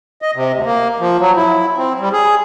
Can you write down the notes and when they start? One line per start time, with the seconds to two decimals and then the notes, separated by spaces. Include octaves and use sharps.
0.22 D#5
0.35 C3
0.53 D2
0.66 A#3
1.00 F3
1.20 F#3
1.36 E4
1.78 C4
2.00 G3
2.12 G#4